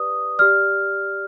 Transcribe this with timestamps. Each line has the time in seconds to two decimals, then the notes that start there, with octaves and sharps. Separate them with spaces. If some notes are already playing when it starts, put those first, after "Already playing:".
Already playing: G4 B4 D5 D#6
0.38 G4 D5 F6